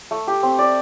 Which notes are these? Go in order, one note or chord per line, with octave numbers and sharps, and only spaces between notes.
A3
G4
C4
D5